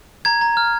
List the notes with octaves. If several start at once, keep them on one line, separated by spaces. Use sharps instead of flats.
A#5 G#6
A#5
F6